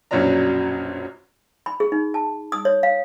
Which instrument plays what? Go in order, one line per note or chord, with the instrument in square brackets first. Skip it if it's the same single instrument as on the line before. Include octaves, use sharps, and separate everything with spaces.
[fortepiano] A#1 F#2 B2 F#3 D4 A#5
[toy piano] B5
G#4
D#4
A5
D#6
C#5
F5